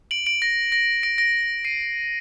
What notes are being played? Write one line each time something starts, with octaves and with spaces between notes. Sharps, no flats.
D7 F#7
D7 F#7
A#6
A#6
A#6 D7
A#6 D7
C7 D#7